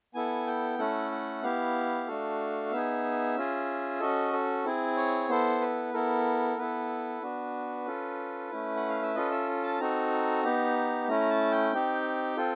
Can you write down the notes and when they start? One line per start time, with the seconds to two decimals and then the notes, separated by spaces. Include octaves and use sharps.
0.14 B3 E4 A4 G#5
0.47 G5
0.79 A3 C#4 E4 A4 F#5
1.12 F#5
1.43 B3 E4 G4 F5
2.07 A3 D4 F#4 A4
2.72 B3 D#4 G#4 E5
3.36 C#4 F4 G#4
4.00 C#4 F#4 A4 D#5
4.33 A4
4.65 C4 E4 G#4
4.97 C#5
5.29 B3 E4 A4 C5
5.61 B4
5.94 B3 E4 A4 A#4
6.58 B3 E4 A4 B4
7.22 B3 D4 F#4
7.86 C#4 F4 A4
8.51 A3 C#4 E4
8.76 F#5
8.89 F5
9.03 E5
9.15 C#4 F4 A4 D#5
9.31 E5
9.64 A5
9.80 C4 D#4 F#4 A4 A#5
10.44 B3 D#4 G4
11.08 A3 C#4 E4 A#5
11.20 A#5
11.30 A5
11.51 G5
11.73 C4 D#4 G4
12.37 C4 F4 A4